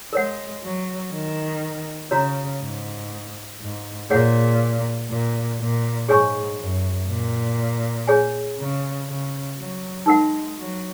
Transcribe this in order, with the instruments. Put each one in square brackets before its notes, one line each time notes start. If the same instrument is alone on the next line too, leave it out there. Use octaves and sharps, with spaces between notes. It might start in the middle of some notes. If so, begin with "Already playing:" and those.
[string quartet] G#3 [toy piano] A#4 C#5 F#5
[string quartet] F#3
D#3
[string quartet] C#3 [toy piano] F#4 C#5 A#5
[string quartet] G#2
G#2
[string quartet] A#2 [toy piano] G#4 C#5 F#5
[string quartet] A#2
A#2
[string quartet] G#2 [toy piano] G#4 C#5 G#5 C#6
[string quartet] F#2
A#2
[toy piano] G#4 C#5 G#5
[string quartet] C#3
C#3
F#3
[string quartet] G#3 [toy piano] D#4 A#4 F#5
[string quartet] F#3